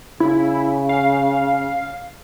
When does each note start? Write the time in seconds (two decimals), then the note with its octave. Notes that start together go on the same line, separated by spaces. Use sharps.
0.20 C#3 E4
0.89 F5